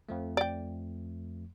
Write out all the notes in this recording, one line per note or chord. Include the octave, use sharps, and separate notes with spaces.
F2 F3 A3
D5 G5